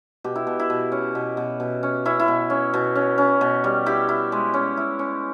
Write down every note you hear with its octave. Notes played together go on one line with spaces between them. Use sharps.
B2 G4
E4
B2
E4
B2
C#4
B2
B2
B2
C#4
C#4 E4
E4
B2
C#4
B2
C#4
C#4
B2
G3
E4 G4
E4
G#3
C#4
E4
C#4